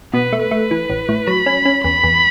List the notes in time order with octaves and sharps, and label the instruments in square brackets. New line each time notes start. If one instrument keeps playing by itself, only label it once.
[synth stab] B2 [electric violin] B4
[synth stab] A3
[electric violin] B4
[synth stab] A3
E3
A1
A2
[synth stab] F#3 [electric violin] B5
[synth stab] C#4
C#4
[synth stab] E2 [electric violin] B5
[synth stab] E2